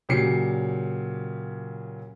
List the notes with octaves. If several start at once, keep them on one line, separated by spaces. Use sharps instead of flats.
A#2 C#3 F#3 G4 C7 C#7